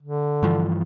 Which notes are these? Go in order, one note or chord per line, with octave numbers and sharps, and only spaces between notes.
D3
G2 E3 F3